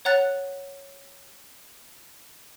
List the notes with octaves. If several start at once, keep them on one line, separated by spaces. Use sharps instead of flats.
C#5 F#5 A#5 F#6 A6